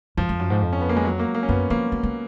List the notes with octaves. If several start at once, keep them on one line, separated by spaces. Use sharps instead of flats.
F#2 F3
F2
F#2
G#2
F2
C#4
B3
A#3
G#3
F#3
A#3
A#3
C#4
F#2 B3
F3 A#3
F#3
A#3